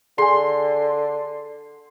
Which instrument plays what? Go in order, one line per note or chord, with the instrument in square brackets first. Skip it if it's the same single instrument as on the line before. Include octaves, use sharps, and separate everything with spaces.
[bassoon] D3 [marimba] G#4 G#5 [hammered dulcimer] C6